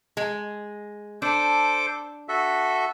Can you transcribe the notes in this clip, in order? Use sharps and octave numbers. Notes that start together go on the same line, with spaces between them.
G#3
D4 A4 C5 D6
F#4 A4 E5